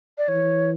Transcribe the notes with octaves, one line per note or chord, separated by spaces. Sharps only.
D5
E3 C#5